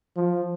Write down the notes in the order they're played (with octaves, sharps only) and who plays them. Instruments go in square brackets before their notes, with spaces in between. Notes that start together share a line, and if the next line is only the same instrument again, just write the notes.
[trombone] F3